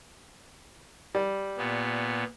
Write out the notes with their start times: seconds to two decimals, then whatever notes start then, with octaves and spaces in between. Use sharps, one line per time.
1.15 G3
1.57 A#2 B3